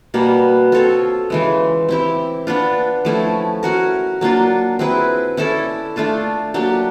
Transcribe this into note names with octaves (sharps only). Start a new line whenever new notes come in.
B2 G3 A#3
C4 F4 A4 C#5
C#3 E3 G#3
C4 E4 G4
B3 D4 F4
F3 A3 C#4 E4
C#4 F#4 A#4
F#3 A#3 D4 F4
C4 E4 G#4 B4
C#4 E4 A4 D5
A3 D4 F4 A4
F#3 A#3 D4 G4